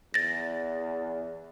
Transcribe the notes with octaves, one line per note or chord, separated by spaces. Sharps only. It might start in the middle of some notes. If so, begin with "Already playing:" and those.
E2 A6 A#6